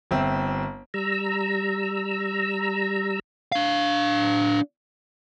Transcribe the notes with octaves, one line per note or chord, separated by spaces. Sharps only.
G1 C4 E5
G3 A#5 E6
D4 F5